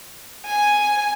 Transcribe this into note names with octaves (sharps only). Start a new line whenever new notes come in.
G#5